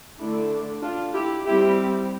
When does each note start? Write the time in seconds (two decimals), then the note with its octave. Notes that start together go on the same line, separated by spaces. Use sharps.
0.19 D3 A3 D4 E4
0.82 D4 F4
1.13 E4 G4
1.45 G3 C4 E4 G4